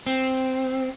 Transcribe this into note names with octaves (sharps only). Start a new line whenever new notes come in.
C4